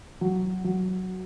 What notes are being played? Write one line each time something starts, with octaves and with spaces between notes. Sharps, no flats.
F#3
F#3